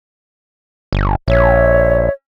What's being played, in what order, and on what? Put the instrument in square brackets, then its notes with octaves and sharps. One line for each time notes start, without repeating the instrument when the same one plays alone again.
[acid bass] G1
[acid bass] A#1 [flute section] C#5 E5